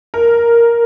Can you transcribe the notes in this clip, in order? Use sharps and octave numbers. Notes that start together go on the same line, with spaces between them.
A#4